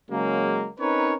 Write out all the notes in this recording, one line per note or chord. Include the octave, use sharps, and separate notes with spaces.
C#3 F#3 G#3 A#3
C4 C#4 D#4 A#4 B4 C#5